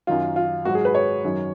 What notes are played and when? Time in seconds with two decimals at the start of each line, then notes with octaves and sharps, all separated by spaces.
0.07 F#2 D#3 F#3 F4
0.36 F4
0.65 G#2 F#3 F#4
0.75 G#4
0.85 B4
0.95 C#5
1.24 F#2 D#3 F#3